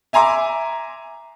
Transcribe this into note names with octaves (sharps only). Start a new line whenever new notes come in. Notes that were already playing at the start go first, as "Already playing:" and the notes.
E5 G#5 A#5 C6 D6